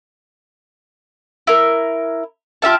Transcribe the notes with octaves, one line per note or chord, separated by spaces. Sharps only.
E4 A#4
F4 G4 E5 A5